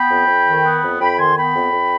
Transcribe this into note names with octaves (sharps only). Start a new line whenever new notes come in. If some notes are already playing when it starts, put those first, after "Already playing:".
Already playing: B3 G5 B5
F2
F2
D#3
B3
F2
F2 G5 B5
D#3 G#5 C6
B3 G5 B5
F2
F2